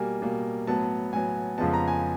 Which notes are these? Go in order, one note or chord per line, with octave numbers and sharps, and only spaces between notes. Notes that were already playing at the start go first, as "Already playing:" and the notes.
Already playing: B2 G3 A#3 G#5
B2 G3 A#3
A2 F#3 B3 A5
A2 F#3 B3 G#5
F2 C#3 F3 G#3 B3 A5
A#5
G#5